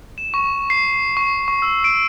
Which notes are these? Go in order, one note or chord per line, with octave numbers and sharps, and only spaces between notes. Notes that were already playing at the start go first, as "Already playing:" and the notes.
E7
C#6
C7
C#6
C#6
E6
D7